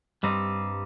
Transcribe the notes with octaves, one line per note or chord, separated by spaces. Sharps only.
G2 G3 C4 D#4